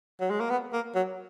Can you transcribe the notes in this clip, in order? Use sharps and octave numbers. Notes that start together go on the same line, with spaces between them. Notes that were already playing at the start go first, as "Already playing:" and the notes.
F#3
G#3
A#3
B3
A#3
F#3